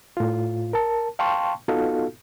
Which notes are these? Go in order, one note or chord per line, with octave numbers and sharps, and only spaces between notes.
A2 F4
A#4 A5
F5 G5 A5 C6 C#6
B3 D#4 F4 F#4 A4 F5